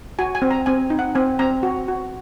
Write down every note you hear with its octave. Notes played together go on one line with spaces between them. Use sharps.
F#4 G#5
G#5
C4
A#5
C4 G#5
D#4
F#5
C4 G#5
C4 A#5
F#4
F#4